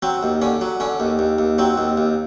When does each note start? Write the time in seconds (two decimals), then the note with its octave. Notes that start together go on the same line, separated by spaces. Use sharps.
0.02 F#3 C4
0.23 D#2
0.42 D3 C#4
0.61 F#3
0.80 D3 C#4
1.00 D#2
1.19 D#2
1.39 D#2
1.58 F#3 C4
1.78 D#2
1.97 D#2